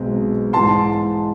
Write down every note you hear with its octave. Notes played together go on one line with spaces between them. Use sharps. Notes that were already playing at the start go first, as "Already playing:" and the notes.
Already playing: B1 B2 G#3 C4
G#2 E3 G#3 A5 C6